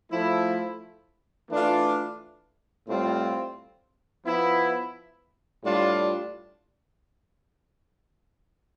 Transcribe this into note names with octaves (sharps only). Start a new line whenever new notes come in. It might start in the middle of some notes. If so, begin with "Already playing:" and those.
F3 A3 E4
E3 A3 D4 F4
A2 G3 C4 F4
F3 B3 E4
A2 G3 D4 F4